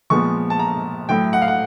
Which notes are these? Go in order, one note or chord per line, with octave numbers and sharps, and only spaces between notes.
A#2 F3 G#3 B3 C#6
A5
A#5
A2 F#3 A3 G5
F#5
F5
F#5